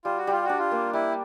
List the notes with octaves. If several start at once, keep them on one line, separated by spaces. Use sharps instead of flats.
G3 F4
F#4
G3 F4
D4 F#4
F4
A#3
G3 E4